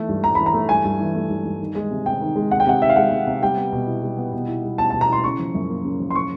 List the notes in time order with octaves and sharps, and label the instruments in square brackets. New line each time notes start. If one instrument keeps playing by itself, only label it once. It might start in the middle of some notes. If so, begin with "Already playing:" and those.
Already playing: [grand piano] E3 A3
G2
[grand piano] G2 [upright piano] A#5
[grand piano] E3 [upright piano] B5
[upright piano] A#5
[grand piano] A3
[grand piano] G2 [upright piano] G#5
[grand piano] G2
E3
A3
G2
G2
D#3
G#3
C3
[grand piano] C3 [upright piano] G5
[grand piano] D#3
G#3
[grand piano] C3 [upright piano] F#5
[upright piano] G5
[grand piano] C3 [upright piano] F#5
[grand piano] D#3 [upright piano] E5
[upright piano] F5
[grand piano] G#3 [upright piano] F#5
[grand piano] C3
C3
[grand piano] G3 [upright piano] G5
[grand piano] B3
B2
E4
G3
B3
B2
E4
G3
[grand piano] B3 [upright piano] A5
[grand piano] B2 [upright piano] A5
[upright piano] A#5
[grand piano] E4 [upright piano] C6
[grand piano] C#3 [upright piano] C#6
[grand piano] F3
F#2
A#3
C#3
F3
[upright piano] C6
C#6